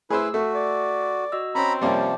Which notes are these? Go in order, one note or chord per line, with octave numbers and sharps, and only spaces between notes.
A3 E4 G#4 B4 C5 E6
A3 F#4 A4
D5
F#4 D#5 E6
C4 C#4 A#5 B5
C3 F3 G3 A#3 C#4 C5 D5 D6